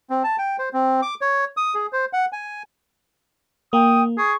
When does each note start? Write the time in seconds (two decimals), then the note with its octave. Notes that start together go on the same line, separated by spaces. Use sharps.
0.10 C4
0.24 A5
0.38 G5
0.59 C5
0.74 C4
1.02 D6
1.21 C#5
1.57 D#6
1.75 G#4
1.93 C5
2.13 F#5
2.33 G#5
3.73 A#3 G5 D#6
4.18 G#4 C#6